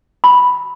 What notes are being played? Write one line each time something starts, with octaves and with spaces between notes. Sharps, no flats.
B5